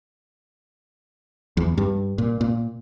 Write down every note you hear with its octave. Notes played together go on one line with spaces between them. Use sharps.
E2
G2
A#2
A#2